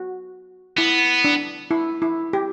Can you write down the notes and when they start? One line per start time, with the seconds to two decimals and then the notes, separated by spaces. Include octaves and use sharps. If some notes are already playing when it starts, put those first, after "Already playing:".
Already playing: F#4
0.78 B3 E4
1.24 D4
1.71 E4
2.02 E4
2.33 G4